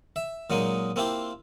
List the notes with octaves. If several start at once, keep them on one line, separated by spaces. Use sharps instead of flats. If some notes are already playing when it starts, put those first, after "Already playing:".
E5
A#2 F#3 G#3 A#3 D#4
A#3 C4 E4 F4 G4